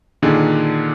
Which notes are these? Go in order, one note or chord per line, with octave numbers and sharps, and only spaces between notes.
A#2 D3 D#3 D4 G#4